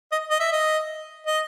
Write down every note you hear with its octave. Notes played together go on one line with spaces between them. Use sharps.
D#5
D#5
E5
D#5
D#5